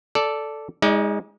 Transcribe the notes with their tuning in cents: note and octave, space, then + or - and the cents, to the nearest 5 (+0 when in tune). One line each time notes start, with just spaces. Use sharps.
A4 +0 D5 -5
G#3 -15 D#4 +35 D5 +0